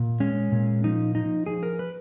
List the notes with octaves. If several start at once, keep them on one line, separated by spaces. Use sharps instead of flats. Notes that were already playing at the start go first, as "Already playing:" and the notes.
Already playing: A#2
G#3 C#4
A#2
F3 D#4
F3 D#4
F3 G#4
A#4
B4